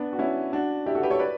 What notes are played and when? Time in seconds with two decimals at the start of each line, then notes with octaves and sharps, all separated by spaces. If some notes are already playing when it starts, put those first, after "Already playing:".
Already playing: B3 D4
0.13 F#4
0.19 C#4 E4
0.53 D4 F#4
0.86 E4 G4
0.95 F#4 A4
1.03 G4 B4
1.11 A4 C#5
1.19 B4 D5